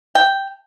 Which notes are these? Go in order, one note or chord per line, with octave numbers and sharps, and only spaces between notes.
G5